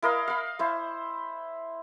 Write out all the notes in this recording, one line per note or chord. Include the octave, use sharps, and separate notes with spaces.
E4 A#4 D#5 F5
F5 B5
E4 C5